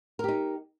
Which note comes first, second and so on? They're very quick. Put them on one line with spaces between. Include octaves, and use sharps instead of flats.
A#4 G4 D#4